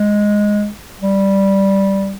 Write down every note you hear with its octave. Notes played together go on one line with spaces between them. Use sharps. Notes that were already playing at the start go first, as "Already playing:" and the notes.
Already playing: G#3
G3